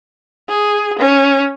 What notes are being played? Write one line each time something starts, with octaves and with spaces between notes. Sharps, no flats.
G#4
C#4